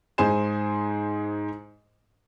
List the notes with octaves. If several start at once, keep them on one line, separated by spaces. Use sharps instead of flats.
G#2 G#4 C5 G#5 C6 E7